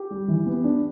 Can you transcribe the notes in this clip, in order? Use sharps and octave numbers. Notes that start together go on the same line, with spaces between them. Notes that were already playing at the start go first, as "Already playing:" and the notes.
Already playing: G4
G3
E3
B3
D4